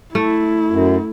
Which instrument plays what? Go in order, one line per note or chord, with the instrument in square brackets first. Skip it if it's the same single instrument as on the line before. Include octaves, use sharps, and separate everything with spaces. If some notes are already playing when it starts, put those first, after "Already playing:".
[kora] A3 [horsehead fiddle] E4
[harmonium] F#2